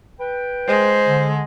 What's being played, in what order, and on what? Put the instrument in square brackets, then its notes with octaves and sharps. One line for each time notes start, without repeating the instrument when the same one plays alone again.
[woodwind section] B4 G5
[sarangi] G#3 [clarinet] C5
[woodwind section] D3